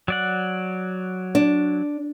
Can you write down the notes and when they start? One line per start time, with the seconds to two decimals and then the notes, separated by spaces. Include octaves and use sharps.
0.08 F#3 D5 F#5
1.35 D4